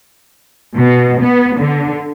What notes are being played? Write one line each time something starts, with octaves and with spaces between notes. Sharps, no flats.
B2
B3
D3